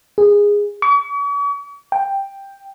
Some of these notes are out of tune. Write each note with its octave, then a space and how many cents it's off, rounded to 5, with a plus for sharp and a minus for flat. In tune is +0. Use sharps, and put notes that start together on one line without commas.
G#4 -15
C#6 +45
G5 +5